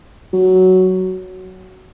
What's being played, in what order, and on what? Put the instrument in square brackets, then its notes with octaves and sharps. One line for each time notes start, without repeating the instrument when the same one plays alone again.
[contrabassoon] F#3